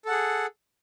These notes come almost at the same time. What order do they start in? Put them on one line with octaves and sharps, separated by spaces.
A4 F#5 G#4